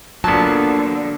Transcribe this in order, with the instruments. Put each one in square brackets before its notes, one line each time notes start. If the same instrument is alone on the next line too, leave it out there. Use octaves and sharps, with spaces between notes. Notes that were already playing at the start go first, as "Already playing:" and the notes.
[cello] D3 [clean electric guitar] F3 A#3 [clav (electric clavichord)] F#3 B3 [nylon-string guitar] A5